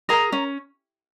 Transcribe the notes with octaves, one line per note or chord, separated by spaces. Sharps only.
G#4 A#4 A#5
C#4